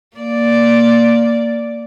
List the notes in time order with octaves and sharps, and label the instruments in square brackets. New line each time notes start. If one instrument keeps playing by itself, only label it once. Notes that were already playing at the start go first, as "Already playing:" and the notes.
[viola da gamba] A#3 D5